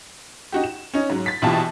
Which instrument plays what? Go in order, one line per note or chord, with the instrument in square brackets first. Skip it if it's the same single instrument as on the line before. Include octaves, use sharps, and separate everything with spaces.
[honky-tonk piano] D#4 F#4 G4
E7
C#4 D#4
G#2 F#3
A6 B6
A#1 B2 E3 F4 G4 A5